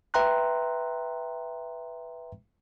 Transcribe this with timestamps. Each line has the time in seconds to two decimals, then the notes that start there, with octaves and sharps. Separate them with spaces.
0.14 B4 E5 G5 A#5 C6 F#6